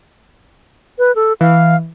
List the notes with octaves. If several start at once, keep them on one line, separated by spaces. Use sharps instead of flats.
B4
A4
E3 F5